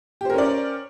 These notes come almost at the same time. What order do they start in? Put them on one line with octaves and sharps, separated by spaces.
G4 C5 A#4 C#4 D5